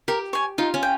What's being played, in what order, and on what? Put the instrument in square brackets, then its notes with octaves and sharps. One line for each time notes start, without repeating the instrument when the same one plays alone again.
[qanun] G4 [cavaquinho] A#4
[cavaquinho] C#5 G#5
[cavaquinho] D#4 [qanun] F4
[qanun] C#4
[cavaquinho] G5